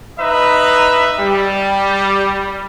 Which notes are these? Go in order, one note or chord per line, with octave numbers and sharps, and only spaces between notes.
D#4 B4 D#5 E5 A#5
G3